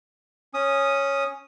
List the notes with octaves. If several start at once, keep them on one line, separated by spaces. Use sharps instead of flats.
C#4 D#6